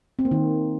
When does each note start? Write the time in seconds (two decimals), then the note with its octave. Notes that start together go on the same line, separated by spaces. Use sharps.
0.19 C4
0.25 A#3
0.31 D#3